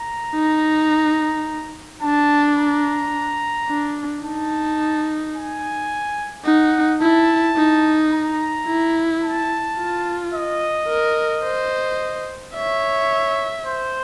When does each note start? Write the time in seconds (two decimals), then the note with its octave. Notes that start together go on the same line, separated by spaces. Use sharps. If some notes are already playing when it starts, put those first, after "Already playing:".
Already playing: A#5
0.35 D#4
2.02 D4 A5
2.57 A#5
3.68 D4
4.23 D#4 A5
5.35 G#5
6.45 D#4 F#5
7.01 E4 A5
7.56 D#4
8.12 A#5
8.67 E4
9.23 A5
9.78 F4
10.33 D#5
10.89 A#4
11.43 C5
12.54 C#5 E5
13.66 C5